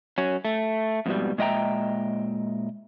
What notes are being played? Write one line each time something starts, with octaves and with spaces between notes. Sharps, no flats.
F#3 C#4
A3
F2 G#2 B2 G3
A#2 G#3 D#5 E5 G5 A#5